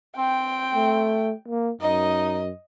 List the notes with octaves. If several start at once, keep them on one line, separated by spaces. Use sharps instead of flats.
C4 G5
A3
A#3
F#2 D#4 D#5